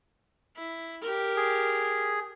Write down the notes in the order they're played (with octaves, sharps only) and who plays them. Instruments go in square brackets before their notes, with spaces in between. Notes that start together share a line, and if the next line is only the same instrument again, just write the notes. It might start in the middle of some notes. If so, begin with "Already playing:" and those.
[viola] E4
G4 A#4
[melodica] G#4